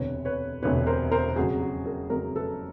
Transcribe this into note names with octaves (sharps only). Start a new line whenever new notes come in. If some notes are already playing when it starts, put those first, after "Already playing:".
Already playing: E1 D2 C3 B4 C#5
B4 C#5
E1 D2 C3 B4 C#5
A#4 C5
A#4 C5
F2 C#3 F#3 F#4 G#4
F#4
G#4 A#4
F2 C#3 F#3 G#4 A#4
A4 B4